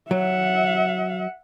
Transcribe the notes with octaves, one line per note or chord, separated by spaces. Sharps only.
F#3 E5 F#5